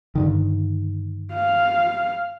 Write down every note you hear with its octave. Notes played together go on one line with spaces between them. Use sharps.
G2 D3 D#3
F5